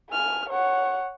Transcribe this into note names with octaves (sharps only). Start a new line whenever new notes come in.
G#5 F6
C#5 F#5